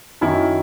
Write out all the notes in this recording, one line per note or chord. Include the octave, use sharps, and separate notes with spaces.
F#2 D#3 E4